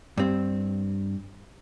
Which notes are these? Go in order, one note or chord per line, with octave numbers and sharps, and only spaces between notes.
G2 C4